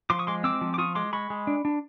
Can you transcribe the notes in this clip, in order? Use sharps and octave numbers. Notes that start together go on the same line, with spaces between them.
F3 C6 D6
C#6 D#6
G#3 C6 D6
C4 D6 E6
F3
D6
F4 C#6 D#6
G#3 C6 D6
G#3 B5 C#6
G#3
D4
D4